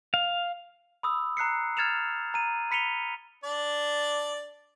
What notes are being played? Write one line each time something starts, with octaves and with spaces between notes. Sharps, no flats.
F5
B5 D#6 E6
A#5 F#6 C7 C#7
F6 G#6 A6 C#7 E7 F7
A#5 D#7
B5 B6 C#7 D#7 F7 G7
D4 D5